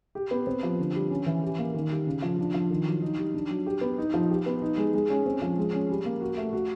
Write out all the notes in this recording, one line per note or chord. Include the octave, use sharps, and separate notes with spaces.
G4
B3
C4
F3
D3
G3
C#4
E3
G4
A#3
D#3
G3
C#3
F3
D4
F3
D#3
F#3
D#4
G3
D4
F#3
G4
B3
D#4
F3
G4
B3
D#4
G#3
G#3
C#4
C4
F3
G#3
C#4
G3
A#3
F#4
A3
F#4